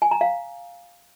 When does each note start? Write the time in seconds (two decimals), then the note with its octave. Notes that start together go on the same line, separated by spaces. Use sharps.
0.02 G#5
0.11 A#5
0.21 F5